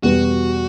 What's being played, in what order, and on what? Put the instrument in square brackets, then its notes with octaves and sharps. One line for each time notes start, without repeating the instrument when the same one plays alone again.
[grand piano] E2 B2 G3 B3 [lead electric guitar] F#4